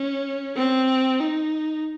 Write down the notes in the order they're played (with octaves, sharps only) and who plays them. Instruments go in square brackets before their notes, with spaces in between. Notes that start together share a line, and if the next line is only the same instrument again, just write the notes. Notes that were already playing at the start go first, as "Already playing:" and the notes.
Already playing: [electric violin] C#4
C4
D#4